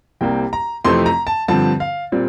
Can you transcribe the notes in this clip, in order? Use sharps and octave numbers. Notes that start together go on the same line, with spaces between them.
C2 C3 G3 A#3 G5
A#5
F2 C3 E3 A3 C4 C6
A#5
A5
G2 D3 F3 C4 A5
F5
A#2 G3 C4